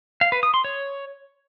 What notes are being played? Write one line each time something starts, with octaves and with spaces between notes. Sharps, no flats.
F5
B4
D#6
C6
C#5